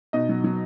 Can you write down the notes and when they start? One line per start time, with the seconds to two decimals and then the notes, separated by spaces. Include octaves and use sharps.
0.13 B2 D#4 D#5
0.29 F#3
0.44 F#3